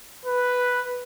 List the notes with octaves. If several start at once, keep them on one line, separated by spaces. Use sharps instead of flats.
B4